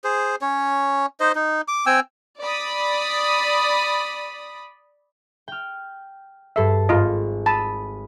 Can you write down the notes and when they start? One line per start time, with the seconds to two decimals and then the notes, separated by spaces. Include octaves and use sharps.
0.04 G#4 C5
0.41 C#4 C#5
1.20 D#4 C5 D#5
1.35 D#4
1.68 D6
1.86 C4 G5 G#5 E6
2.41 D5 B5 D#6
5.48 G5 F6
6.56 G2 A4 E5 C7
6.89 G#1 F4 D#5
7.46 A5 B5 D#6 D#7